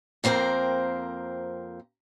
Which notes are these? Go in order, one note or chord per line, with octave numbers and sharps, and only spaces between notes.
F2 A#3 C4 A#4 C5